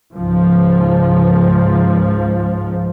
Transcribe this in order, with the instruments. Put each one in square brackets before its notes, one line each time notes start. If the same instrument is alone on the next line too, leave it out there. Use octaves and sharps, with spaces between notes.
[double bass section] C#2 G#2 F3